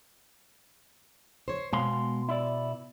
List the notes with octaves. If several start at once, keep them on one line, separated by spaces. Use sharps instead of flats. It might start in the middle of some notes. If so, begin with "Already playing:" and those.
C5 C#5
B2 G#3 F5 C6
E4 D5